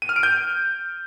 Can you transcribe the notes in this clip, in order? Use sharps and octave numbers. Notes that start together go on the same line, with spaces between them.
D#7
F6
D7
G6